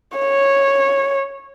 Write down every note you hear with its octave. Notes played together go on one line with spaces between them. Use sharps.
C#5